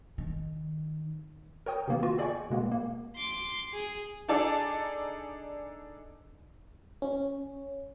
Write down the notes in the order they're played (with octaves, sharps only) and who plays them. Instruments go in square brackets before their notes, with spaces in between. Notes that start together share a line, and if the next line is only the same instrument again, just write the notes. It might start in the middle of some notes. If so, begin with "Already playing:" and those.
[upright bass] D#3
[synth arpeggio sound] A#4 C#5 G5 D#6
C3 D#3 A#3 B3
F4 F#4
G#4 D5 D#5 G5 G#5 C#6
B2 G#3 A#3 B3
A#3
[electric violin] C6 D6
G#4
[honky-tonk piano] D4 D#4 G#4 A4 D5
[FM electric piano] C#4